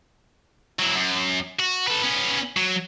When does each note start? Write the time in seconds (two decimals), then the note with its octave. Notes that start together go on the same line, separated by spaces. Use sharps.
0.79 F#3 E4
0.95 F#2
1.60 F#4
1.88 A4 B4
2.04 B3 C#4
2.57 F#3